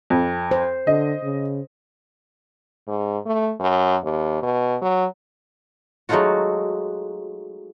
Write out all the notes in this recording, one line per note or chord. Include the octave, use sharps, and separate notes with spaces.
F2
C5
D3 D#5
C#3
G#2
A3
F#2
D#2
B2
F#3
F#3 G#3 A3 D#4 F4 F#4